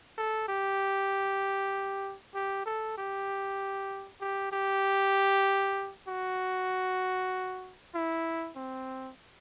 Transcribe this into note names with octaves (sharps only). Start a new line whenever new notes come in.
A4
G4
G4
A4
G4
G4
G4
F#4
E4
C4